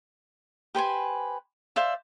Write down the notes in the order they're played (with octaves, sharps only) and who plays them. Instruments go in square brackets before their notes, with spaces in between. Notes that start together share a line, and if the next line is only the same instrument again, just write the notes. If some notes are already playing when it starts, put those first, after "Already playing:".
[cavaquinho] G4 B4 C5 G#5
C5 D5 E5 F5